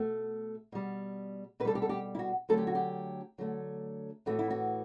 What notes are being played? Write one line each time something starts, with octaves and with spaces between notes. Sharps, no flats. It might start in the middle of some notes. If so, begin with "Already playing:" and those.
Already playing: B2 A3
B2 G3
B2 B4
G3 A4
G4
A4
G4
E4
F#4
D3 F#3 A3 A4
G4
F#4
G4
D3 F#3 A3
A2 E3 A3 F#4
E4
F#4